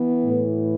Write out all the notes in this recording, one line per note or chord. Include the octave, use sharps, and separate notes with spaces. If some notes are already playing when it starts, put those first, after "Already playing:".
Already playing: E3 B3
A2 E3